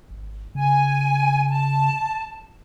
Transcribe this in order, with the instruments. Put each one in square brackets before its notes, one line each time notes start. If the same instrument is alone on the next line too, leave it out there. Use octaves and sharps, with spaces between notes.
[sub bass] G#1
[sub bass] C#3 [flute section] G#5
[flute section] A5